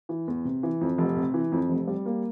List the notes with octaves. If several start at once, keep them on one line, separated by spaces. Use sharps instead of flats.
E3
E2
C3
E3
F2
F1
C3
E3
F2
F1
G3
A#3